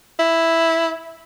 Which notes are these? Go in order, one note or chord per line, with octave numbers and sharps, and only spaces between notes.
E4